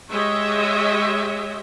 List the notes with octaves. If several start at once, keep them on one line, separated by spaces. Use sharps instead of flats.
G#3 G4 C#5 D#5 E5